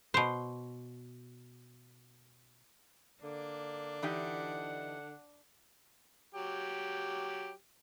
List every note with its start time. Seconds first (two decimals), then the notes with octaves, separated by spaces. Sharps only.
0.14 B2 C5
3.23 D3 A#3 D4
4.02 E3 D#4 G4 F#5
6.35 F#3 G4